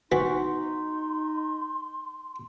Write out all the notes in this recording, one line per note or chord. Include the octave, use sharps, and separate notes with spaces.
E3 D#4 F#4 C6